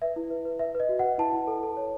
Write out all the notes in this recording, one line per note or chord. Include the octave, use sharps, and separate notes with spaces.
B4 E5
E4
B4
B4
B4 E5
B4
D#5
F#4
B4 F#5
E4 A5
E4
A4
A4
C#5